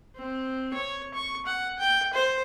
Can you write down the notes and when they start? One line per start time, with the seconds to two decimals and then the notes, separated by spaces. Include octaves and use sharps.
0.16 C4
0.74 C#5
1.14 C#6
1.46 F#5
1.78 G5
2.13 C5